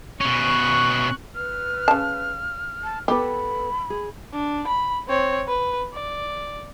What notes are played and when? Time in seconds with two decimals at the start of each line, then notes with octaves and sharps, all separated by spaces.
0.21 B2 C#4 C#6 F#6
1.35 B4 F6
1.88 C#3 A5
2.84 A5
3.08 B3 G4 A4 B4 B5
3.90 G#4
4.33 D4
4.67 B5
5.08 C4 C#5
5.47 B4
5.93 D5